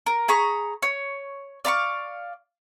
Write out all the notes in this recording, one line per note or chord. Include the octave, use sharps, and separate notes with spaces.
A#4
G#4 A#5 B5 C#6
C#5
D5 F5 B5 C#6